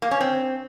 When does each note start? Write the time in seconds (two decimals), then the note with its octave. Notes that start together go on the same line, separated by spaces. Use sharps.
0.02 A#3
0.11 C#4
0.21 C4